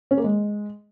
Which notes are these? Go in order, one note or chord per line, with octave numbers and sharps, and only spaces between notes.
C#4
A#3
G#3